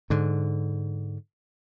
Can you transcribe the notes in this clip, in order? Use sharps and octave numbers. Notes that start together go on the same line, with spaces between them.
G#2 D3